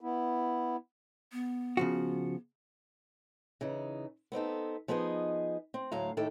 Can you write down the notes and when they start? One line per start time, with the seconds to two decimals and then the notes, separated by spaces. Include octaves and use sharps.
0.01 B3 E4
1.32 B3
1.77 C#3 F3 F#4
3.61 C#3 E3 D#4
4.32 B3 C4 D#4 A4
4.88 F3 B3 D#4 G#4 D#5
5.74 C4
5.92 D2 A2 F#3 F5 A#5
6.17 A2 D#3 A3 G4 A4 G5